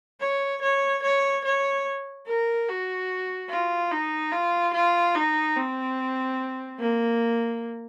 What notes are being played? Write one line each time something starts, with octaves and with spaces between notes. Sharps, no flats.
C#5
C#5
C#5
C#5
A#4
F#4
F4
D#4
F4
F4
D#4
C4
A#3